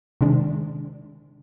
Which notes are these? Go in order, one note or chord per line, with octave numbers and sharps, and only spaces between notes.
C3 D#3 G#3 D4